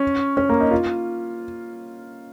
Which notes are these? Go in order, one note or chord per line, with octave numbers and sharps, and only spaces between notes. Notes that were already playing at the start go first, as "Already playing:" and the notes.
Already playing: C#4
C#4
A#3
D#4
F4